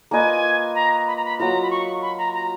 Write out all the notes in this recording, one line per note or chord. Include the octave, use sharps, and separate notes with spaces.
A#3 F4 B4 D#5 G#5
A#5
B5
A#5
B5
F#3 A#3 F4 A#5
B5
C#6
B5
A#5
A#5